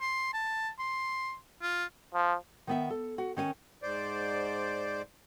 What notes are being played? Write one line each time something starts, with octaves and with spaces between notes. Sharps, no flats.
C6
A5
C6
F4
F3
D#3 B3 E5
A4
F#4
D#3 C#4 F5 G#5
G#2 C5 D5